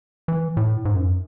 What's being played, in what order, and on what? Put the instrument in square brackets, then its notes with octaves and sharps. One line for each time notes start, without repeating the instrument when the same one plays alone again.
[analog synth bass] E3
A2
G#2
F#2